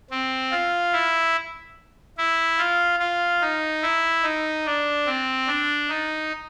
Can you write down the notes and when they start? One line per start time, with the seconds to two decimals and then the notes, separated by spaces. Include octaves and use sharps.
0.10 C4
0.52 F4
0.93 E4
2.18 E4
2.58 F4
3.00 F4
3.41 D#4
3.82 E4
4.23 D#4
4.66 D4
5.06 C4
5.47 D4
5.89 D#4